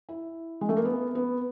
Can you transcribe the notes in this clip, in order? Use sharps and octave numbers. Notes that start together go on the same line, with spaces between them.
E4
G#3
A3
A#3
B3
B3